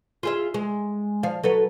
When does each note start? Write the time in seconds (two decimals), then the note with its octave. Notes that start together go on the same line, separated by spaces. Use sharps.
0.23 F4 G#4 E5
0.54 G#3
1.23 F3 F5
1.43 F#3 A4 B4